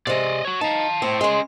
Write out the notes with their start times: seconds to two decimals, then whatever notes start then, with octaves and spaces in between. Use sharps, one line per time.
0.07 C3 G#3 D5 D#5
0.45 F#4 C#5
0.61 D#4 F5 A5
1.02 A2 C4
1.21 C#3 G#3 C#4 C6